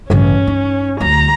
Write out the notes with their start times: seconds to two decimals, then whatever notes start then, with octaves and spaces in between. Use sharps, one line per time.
0.10 A1 G2 C#3 C#4
0.47 D#4
1.00 D2 F#3 A#5